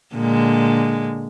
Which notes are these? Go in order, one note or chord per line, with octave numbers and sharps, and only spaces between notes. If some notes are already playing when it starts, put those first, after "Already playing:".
A#2 D3 G#3